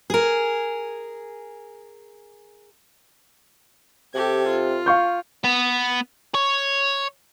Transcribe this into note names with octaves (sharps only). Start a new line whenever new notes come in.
G#4 A#4
C3 G4 A4 G#6
F4
F5 C#6 G6
B3
C#5